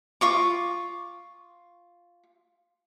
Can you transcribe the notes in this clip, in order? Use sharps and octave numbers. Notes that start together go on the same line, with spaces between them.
F4 C#6 D6